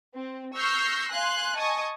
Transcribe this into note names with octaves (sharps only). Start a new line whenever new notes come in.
C4
C#6 E6 F6 G6 A#6 C7
F5 G#5 C6 F#6
D#5 G#5 A5 C#6 D#6